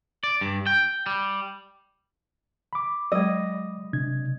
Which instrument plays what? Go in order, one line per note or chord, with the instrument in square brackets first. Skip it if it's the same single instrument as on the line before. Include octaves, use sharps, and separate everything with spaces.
[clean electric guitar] D5
G2
G5
G3
[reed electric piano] B5 D6
[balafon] F#3 G#3 [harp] D#5
[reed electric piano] C3 D4 G#6